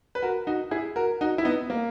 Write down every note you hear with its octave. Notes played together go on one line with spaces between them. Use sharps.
B4
F#4 A#4
D#4 F#4
E4 G#4
F#4 A#4
D#4 F#4
E4
B3 D#4
A#3